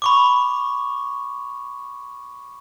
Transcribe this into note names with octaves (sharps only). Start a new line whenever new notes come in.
B5 C#6 D6